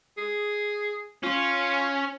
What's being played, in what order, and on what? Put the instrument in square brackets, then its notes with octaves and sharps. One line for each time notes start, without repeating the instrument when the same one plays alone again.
[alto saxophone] G#4
[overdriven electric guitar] C#4 [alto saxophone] F4